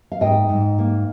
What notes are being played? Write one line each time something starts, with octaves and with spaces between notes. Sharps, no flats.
F5
G#2 D#5 G5
G#2
A#3